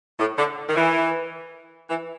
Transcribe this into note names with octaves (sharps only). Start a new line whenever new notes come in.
A2
D3
D#3
E3
E3